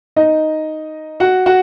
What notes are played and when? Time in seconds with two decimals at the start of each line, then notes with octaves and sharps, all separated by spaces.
0.16 D#4 D#5
1.20 F#4 F#5
1.46 F#4 F#5